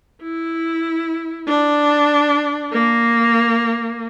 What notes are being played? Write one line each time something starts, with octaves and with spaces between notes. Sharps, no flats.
E4
D4
A#3